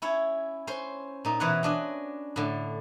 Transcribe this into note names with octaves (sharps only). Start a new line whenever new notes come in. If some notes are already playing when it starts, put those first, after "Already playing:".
C#4 E4 C#5
C#4 C5 C6
A#2 D#4
B2 E3 B4 C#5 F#5
C#4 D4 D#5
A2 D3